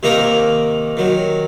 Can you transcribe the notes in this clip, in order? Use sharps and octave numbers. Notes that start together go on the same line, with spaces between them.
C3 D#3 A#3 D#4 A#4
D#3 F#3